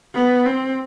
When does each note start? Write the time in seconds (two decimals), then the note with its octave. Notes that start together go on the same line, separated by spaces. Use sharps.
0.14 B3
0.46 C4